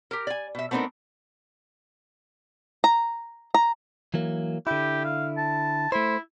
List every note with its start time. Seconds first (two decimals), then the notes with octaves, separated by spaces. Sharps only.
0.11 G4 A#4
0.27 D5 G#5
0.55 B2 E5
0.71 A3 B3 C4 D4 D#4 A#4
2.84 A#5
3.54 A#5
4.14 E3 F#3 A#3
4.67 D3 E4 G4
5.05 F5
5.37 A5
5.92 A3 E4 C5